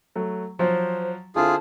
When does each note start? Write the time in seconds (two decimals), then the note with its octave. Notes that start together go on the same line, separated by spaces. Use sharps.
0.16 F#3 A3
0.59 F3 F#3 C5
1.36 D3 C4 E4 F4 G#4 A5